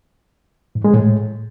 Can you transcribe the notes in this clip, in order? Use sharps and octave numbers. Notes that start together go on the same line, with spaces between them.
G#2
G#3
A2